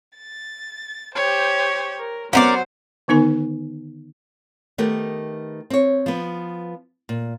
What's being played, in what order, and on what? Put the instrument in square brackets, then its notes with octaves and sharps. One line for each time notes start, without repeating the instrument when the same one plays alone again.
[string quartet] A6
[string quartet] G4 C5 [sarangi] C#5
[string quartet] A#4
[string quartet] F#3 [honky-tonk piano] B3 F#5 [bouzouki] C#4 A#4 D5 [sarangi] C5
[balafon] D3 D#3 B3 D#4 A#4 G#5
[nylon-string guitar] D#3 A3 B3 G4 A#4
C4 C#5
F3 B3
A#2